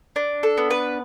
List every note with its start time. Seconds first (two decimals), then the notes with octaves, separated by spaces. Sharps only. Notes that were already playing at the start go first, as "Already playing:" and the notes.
0.16 D4
0.43 A4
0.57 B3
0.70 B4